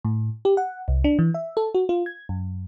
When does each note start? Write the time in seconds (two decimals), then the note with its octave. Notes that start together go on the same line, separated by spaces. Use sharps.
0.05 A2
0.45 G4
0.57 F#5
0.88 C2
1.04 D4
1.19 E3
1.34 E5
1.57 A4
1.75 F#4
1.89 F4
2.06 G#6
2.29 F#2